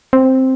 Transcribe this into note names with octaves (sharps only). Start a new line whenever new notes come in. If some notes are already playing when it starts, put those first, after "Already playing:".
C4